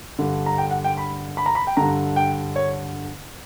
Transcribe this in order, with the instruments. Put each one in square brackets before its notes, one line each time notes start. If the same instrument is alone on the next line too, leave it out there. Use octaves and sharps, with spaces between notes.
[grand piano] G2 D3
A#5
G5
F#5
G5
B5
B5
A#5
B5
G5
G2 D3 A#5
G5
C#5